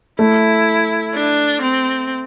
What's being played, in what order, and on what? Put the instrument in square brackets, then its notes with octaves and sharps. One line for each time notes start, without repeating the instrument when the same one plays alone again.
[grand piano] A3 [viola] E4
[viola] D4
C4